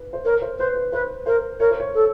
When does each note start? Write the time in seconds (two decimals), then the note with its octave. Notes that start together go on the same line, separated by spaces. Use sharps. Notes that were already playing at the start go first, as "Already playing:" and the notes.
Already playing: B4
0.13 C5
0.25 A#4 C#5
0.42 C5
0.58 B4 C5
0.75 B4
0.92 B4 C5
1.26 A#4 C5
1.60 A#4 C#5
1.70 C5
1.80 C#5
1.95 A4